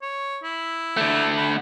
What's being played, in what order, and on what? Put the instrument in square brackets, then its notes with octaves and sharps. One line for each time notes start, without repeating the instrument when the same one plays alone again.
[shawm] C#5
E4
[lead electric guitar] D3 A3
[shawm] B5